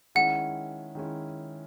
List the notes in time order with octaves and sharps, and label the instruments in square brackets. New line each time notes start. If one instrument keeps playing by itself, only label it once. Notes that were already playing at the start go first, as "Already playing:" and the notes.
[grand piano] D#3 G#3 C#4 E4 [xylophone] F#5
[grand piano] D#3 G#3 C#4 E4